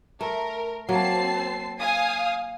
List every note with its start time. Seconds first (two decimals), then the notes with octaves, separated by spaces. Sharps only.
0.21 A3 A#4
0.89 F#3 A#3 C4 A5 C7
1.81 F5 G#5 D#6